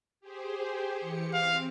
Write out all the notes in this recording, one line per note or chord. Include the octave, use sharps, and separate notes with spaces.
G4 G#4 C5
E3 G4 C#7
C4 F5